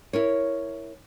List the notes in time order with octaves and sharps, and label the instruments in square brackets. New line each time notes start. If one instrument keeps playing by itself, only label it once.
[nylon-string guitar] E4 A#4 C#5